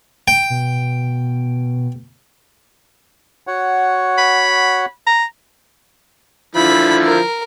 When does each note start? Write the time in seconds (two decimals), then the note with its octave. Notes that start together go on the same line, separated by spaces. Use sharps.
0.28 G5
0.50 B2
3.47 F#4 C#5 F#5
4.18 B5
5.07 A#5
6.55 D3 F3 E4 B5
7.05 A#4